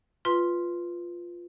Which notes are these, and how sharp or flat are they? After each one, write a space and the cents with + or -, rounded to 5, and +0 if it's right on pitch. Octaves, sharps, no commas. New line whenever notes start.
F4 +0 B4 +0 C6 +0